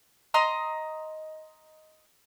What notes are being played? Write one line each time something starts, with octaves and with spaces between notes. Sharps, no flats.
D#5 A#5 C6